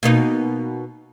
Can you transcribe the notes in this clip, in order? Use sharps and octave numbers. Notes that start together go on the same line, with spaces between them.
B2 A#3 D#4